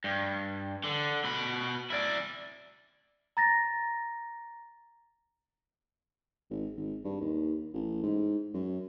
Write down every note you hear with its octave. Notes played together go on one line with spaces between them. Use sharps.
G2
D3
B2 B5
E4 D5
A#5 A6 A#6
G#1
G#1
G2
D#2
A1
G#2
F#2